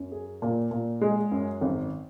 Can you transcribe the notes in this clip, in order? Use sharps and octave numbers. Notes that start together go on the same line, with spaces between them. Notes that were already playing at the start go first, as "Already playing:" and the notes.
Already playing: F#2
G#4
A#2
A#2
G#3
F#2
G#1